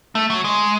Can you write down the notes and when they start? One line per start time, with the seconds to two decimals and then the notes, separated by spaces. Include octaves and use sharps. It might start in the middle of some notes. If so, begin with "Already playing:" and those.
0.15 A3
0.30 F#3
0.44 G#3